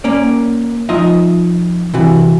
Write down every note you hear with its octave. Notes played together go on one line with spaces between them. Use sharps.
A#3 C#4 D5
F3 D#4 F4 D#5 E5
C3 E3 F#4